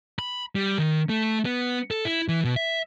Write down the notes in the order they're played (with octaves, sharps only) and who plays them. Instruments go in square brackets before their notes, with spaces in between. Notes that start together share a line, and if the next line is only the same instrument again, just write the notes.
[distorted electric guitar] B5
G3
D#3
A3
B3
A4
E4
E3
B2
E5